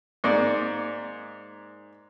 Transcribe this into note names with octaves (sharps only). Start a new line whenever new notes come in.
G#2 A#3 D5